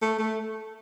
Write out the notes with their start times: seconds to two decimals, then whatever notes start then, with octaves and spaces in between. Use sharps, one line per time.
0.02 A3
0.19 A3